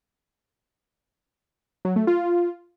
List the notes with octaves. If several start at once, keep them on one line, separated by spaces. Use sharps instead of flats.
F#3
A3
F4